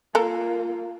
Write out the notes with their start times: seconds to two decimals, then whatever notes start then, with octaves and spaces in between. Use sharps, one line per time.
0.15 A#3 F4 A4 A#4